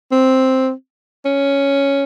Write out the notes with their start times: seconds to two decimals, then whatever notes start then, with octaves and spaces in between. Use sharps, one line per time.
0.12 C4
1.25 C#4